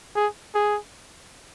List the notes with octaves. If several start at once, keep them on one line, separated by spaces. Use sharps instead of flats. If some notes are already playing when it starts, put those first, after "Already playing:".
G#4
G#4